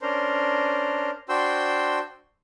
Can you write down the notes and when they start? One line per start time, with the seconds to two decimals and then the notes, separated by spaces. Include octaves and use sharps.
0.01 C#4 D4 A#4 C5
1.29 D4 F#4 C5 G5 C6 E6